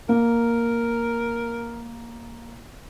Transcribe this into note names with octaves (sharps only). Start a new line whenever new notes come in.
A#3 A#4